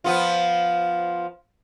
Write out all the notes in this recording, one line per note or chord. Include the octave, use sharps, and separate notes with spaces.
F3 B3 F4